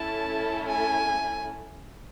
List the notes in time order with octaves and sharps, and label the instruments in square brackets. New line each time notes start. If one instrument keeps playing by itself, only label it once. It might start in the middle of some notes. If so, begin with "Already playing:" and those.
Already playing: [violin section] A3 C#4 E4 A4 [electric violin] A5
[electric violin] G#5